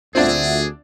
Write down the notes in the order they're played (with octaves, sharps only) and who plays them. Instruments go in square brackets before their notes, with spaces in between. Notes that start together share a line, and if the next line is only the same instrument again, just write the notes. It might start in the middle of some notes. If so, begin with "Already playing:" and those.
[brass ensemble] D2 [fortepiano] C4 D4 [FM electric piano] F4 E5 F#5 [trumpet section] G#4